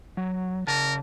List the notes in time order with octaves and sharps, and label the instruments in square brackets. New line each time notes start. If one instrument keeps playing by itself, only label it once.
[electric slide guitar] F#3
[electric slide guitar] C#3 A5 [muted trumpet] A#4